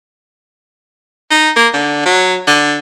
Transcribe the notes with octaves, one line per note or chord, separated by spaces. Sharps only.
D#4
A#3
D3
F#3
D3